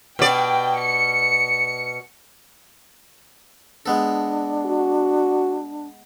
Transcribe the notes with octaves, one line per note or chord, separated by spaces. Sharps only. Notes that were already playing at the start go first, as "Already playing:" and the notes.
B2 D5 G5
C#7
G#3 B3 D4 A4
F#4